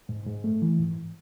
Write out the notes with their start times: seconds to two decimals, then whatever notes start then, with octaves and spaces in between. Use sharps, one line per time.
0.09 G#2
0.26 G#2
0.44 A3
0.62 E3
0.79 G#2